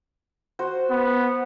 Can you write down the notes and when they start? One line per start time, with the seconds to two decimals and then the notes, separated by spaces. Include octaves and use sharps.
0.59 F#4 C5
0.91 B3